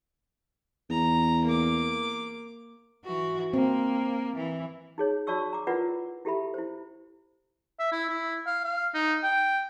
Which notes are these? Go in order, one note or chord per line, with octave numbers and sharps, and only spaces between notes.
E2 A#5
A#3 D6
E3 F#4
A#3 C4
E3
D#4 G#4 C#5
F#4 C#5 D5 A5 C#6 E6
A#5 D6
E4 F4 A#4 B4 D5 F#5
E4 G4 A4 E5 B5
E4 C5
E5
E4
E4
F5
F5
D#4
G5